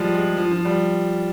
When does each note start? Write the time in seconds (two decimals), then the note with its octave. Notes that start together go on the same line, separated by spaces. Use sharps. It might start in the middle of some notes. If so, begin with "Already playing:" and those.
Already playing: F3 G3 G#3
0.15 G#3
0.37 F3
0.51 F3
0.65 G3